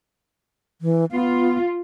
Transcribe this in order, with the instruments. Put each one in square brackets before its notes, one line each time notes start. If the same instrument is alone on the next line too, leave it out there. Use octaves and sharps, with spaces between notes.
[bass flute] E3
[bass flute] B3 [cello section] F4